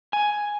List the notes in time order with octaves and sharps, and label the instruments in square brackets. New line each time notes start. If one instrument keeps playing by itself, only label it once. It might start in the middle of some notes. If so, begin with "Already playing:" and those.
[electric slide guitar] G#5